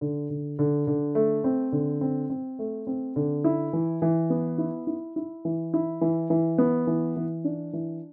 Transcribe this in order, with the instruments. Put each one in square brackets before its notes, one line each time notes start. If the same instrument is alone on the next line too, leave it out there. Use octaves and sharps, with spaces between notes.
[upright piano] D3
D3
D3
D3
A3
C4
D3
C4
C4
A3
C4
D3
E4
E3
E3
B3
E4
E4
E4
E3
E4
E3
E3
B3
E3
E3
D4
E3